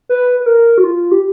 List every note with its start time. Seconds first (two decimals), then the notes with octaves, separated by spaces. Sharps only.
0.09 B4
0.40 B4
0.46 A#4
0.78 F#4
0.83 F4
1.11 G4